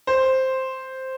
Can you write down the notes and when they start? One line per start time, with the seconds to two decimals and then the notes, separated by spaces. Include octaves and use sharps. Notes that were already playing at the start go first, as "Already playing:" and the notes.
0.07 C5